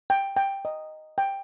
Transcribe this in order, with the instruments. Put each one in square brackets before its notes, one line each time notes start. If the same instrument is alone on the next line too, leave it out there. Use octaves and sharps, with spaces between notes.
[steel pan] G5
G5
D#5
G5